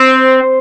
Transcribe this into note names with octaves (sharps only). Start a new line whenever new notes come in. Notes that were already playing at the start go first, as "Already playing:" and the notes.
Already playing: C4